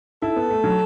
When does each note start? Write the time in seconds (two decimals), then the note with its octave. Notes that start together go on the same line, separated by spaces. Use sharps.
0.22 E4 A4
0.36 B3
0.50 A3
0.64 F#3